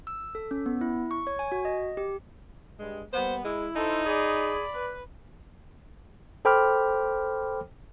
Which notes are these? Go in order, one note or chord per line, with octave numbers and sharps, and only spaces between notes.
E6
A4
C#4
B3
E4
C#6
C#5
G#5
F#4
D#5
G4
G2 G3 G#3
G3 A#3 B3 C5
G#3 E4
D#4 A4 C5
G#4 D5 B5
B4
A4 C5 G5 B5 D6 F6